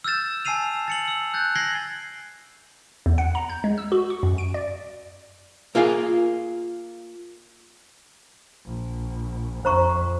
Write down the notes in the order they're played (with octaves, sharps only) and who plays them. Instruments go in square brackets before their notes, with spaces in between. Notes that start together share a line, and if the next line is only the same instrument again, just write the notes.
[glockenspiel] E6 F6 G6 A6 E7
G#5 A5 E6 C7 D#7 F7
A6 C#7 F#7
E6
F#6 G6 A6
G#6 A#6 C7 D7 F#7 G7
[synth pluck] E2
F#5
A#5
G6
G#3
E6
F#4
C#6
F#2
D7
D5
[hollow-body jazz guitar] A#3 F4 G#4 F5
[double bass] A#1
[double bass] F2 [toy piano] C5 A#5 C#6